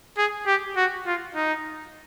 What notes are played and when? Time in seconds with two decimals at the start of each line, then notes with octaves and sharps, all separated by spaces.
0.18 G#4
0.47 G4
0.76 F#4
1.06 F4
1.35 D#4